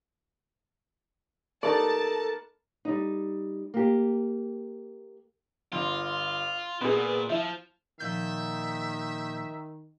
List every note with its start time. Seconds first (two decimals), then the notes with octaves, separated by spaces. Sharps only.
1.63 B3 D#4 A4 A#4 D5 A5
2.85 G3 D#4
3.74 A#3 G4
5.72 G1 F4 C6
6.81 A#2 B3 G#4
7.30 F3 E4
8.00 A#2 D#3 F3 E5 G6